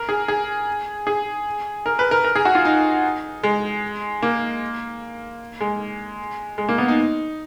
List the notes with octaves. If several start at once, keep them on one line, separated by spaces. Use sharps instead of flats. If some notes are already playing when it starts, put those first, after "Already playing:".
Already playing: A#4
G#4
G#4
G#4
A#4
B4
A#4
A#4
G#4
F#4
F4
D#4
G#3
A#3
G#3
G#3
A#3
B3
D#4